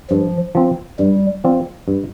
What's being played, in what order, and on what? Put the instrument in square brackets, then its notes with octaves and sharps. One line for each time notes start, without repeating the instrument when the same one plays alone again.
[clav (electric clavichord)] G2 [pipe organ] F3
[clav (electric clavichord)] F3 C4
[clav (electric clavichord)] G2 [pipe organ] G3
[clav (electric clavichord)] F3 C4 F4 D5
G2